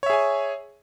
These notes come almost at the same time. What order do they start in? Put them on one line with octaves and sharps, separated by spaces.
C#5 E5 G#4 G#5